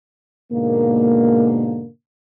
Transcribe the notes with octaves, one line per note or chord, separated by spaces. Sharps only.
G#2 B2 D3 A#3